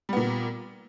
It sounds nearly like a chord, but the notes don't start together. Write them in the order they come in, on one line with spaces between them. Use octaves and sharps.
G3 B3 A#2